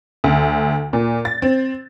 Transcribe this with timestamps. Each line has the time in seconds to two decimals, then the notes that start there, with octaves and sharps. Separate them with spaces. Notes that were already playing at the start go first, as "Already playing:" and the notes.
0.24 D2
0.93 A#2
1.25 A6
1.42 C4